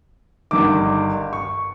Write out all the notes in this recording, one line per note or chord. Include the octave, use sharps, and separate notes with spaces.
G1 G2 D#3 D6
C#6